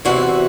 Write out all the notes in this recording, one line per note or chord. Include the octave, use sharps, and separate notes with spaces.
E2 C3 E3 F#4